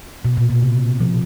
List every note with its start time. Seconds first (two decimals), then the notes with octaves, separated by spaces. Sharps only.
0.25 B2
0.37 A#2
0.50 B2
0.62 C3
1.00 F3